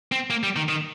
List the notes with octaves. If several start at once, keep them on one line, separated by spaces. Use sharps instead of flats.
C4
A#3
G3
D#3
D#3